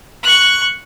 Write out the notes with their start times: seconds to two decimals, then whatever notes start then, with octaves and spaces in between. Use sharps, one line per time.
0.23 C#6 F#6